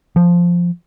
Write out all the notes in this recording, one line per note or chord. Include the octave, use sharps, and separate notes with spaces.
F3